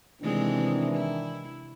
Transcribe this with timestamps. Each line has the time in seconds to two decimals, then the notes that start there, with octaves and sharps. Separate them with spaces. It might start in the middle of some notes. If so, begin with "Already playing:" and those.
0.22 C3 D#3 E3 G#3 C4 D4
0.96 E4